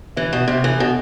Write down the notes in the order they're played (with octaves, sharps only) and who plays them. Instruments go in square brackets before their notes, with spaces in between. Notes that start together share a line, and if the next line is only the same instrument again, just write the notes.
[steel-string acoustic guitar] E3 [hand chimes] E5
[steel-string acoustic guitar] B2
[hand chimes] E5
[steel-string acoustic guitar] C3
[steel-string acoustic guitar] E3 [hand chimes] A4
[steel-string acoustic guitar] B2